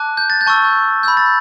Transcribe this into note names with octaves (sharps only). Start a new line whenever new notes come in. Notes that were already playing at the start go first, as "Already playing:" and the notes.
Already playing: A5 D6 F#6
G6
A6
G6
A5 C#6 E6
B5 E6 G6
A6